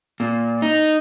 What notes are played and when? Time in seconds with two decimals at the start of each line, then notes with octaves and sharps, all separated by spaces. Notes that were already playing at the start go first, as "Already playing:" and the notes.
0.20 A#2
0.62 D#4